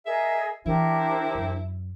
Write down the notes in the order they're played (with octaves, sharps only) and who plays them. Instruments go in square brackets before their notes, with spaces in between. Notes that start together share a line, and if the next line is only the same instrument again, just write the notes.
[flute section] G#4 A#4 D#5 [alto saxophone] E5
[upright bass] E3 [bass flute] D4 [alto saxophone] E4 [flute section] G4 A#4 C5
[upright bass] F#2